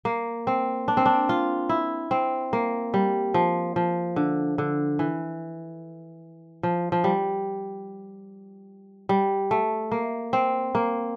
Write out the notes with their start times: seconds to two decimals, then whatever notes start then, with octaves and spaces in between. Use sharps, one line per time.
0.05 A#3
0.47 C4
0.88 D4
0.97 C4
1.06 D4
1.29 F4
1.69 E4
2.11 C4
2.53 A#3
2.94 G3
3.34 F3
3.76 F3
4.16 D3
4.58 D3
4.99 E3
6.63 F3
6.92 F3
7.04 G3
9.09 G3
9.51 A3
9.92 A#3
10.33 C4
10.75 A#3